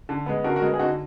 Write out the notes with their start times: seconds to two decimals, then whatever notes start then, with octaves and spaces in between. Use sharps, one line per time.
0.09 D3
0.26 G#3 B3
0.44 D3 F#4 A#4
0.56 F#4 A#4
0.62 G#3 B3
0.74 G#4
0.79 D3 D#4 F#4